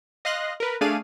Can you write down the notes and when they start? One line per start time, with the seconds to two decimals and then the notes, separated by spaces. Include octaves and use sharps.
0.25 D#5 F5 C6 F#6 A#6
0.60 A#4 B4
0.81 A3 D4 G#4 D5 F5 D#7